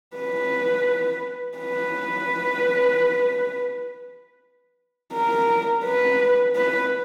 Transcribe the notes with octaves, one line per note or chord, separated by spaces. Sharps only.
B4
B4
A#4
B4
B4